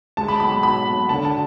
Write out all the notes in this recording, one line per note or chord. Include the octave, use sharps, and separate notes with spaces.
G#3 A5
B5
B1 B5
B5
B2 B5
B1
D3 A5
A5